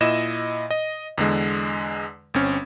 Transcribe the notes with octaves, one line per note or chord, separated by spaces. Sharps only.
A#2 E4 D#5 E7
D#5
E2 D3 G#3
G1 C4 C#4